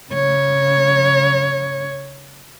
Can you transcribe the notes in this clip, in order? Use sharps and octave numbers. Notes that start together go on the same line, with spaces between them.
C#3 C#5